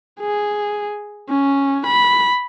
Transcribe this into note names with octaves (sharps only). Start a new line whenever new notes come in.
G#4
C#4
B5